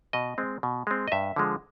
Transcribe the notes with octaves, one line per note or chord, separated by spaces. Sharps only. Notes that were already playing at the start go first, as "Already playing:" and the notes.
B2 D#5
G#3 C4
B2
G#3 C4
D#5
G2 E5
D3 F3 G#3